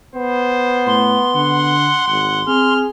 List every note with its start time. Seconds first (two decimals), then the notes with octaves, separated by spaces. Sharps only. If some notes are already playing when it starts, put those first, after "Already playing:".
0.15 B3 C5
0.87 A2 C6
1.35 D3 F#5
2.08 G#1 F#5
2.47 C4 G#4 F6